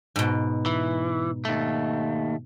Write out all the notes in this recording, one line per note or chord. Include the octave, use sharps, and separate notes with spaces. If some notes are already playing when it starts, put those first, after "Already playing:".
G#2 B2
E3
D#2 A3